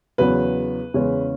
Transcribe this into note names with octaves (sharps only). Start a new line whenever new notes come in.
E2 C#3 F#3 B3 B4
E2 C#3 G#3 C#4